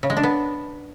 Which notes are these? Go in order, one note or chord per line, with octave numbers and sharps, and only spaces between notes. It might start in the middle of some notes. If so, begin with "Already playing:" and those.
C#3
G#3
D4
B3